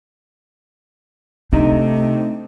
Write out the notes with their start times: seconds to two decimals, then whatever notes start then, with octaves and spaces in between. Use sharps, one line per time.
1.53 C3 A3 D4 D#4